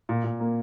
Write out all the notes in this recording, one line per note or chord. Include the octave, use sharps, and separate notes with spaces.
A#2
A#2
A#3